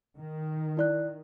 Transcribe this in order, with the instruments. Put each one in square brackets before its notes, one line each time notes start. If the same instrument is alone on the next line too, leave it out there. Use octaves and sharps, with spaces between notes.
[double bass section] D#3
[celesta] E4 D5 F#6